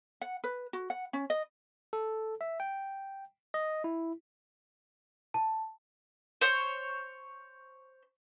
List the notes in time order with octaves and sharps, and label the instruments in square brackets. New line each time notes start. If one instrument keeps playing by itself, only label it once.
[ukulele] F#5
B4
F#4
F#5
C#4
D#5
[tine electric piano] A4
E5
G5
D#5
E4
[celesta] A5
[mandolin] C5 C#5